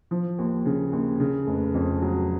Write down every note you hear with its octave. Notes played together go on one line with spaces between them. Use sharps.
F3
D#2
C#3
D#2
C#3
F1
F2
F#3